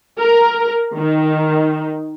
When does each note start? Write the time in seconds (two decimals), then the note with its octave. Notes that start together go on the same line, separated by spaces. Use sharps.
0.20 A#4
0.96 D#3